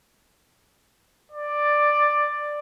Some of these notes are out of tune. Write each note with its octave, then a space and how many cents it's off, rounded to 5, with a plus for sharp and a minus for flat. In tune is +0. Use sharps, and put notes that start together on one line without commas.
D5 +10